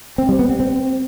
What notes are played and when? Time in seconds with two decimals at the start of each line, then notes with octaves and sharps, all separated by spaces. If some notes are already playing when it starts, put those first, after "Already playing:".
0.18 C4
0.29 G3
0.39 B3
0.49 C4
0.60 C4